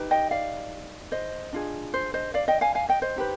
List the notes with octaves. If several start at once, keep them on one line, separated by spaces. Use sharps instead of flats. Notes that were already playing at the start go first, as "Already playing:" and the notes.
Already playing: D#4 G4 B4
D#5 G5
D5 F5
C5 D#5
D4 F4 G#4
C5
C5 D#5
D5 F5
D#5 G5
F5 G#5
F5 G#5
D#5 G5
C5 D#5
D#4 G4 B4